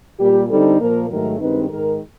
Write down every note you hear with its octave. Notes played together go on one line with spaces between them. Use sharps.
A#2 G3 A#3 G4
D3 G3 C4 D#4 A4
A#2 F3 A#3 A#4
G#2 D#3 F#3 A3 A#4
G2 D#3 G#3 C4 D#4 B4
G#2 D#3 G#3 A#4